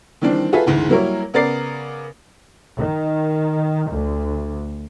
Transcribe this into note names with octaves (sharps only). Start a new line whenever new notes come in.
D#3 E3 G3 C4 D4
F4 F#4 G#4 A4 B4 E5
F#1 D2 G#2 E3
F#3 G3 A#3 E4 A#4 C#5
C#3 B3 A#4 D5 A6 C7
D#3
D2